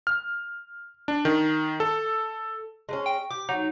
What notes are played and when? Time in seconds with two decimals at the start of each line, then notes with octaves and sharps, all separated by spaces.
0.07 F6
1.08 D4
1.25 D#3
1.80 A4
2.89 G#3 A3 C#4
3.06 G5
3.31 G4 D6
3.49 F#3 D#4